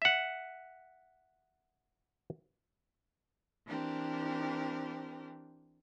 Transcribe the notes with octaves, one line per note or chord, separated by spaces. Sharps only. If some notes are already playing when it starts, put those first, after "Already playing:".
E5 F#5
E3 C4 D4 G4 A#4